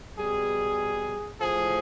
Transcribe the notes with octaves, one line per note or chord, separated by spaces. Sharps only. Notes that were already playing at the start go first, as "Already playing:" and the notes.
B2 G3 G#4
A2 F3 G#4